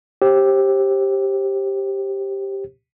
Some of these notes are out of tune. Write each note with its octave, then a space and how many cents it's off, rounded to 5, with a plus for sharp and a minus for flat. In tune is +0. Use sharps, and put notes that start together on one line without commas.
G4 +0 C5 +35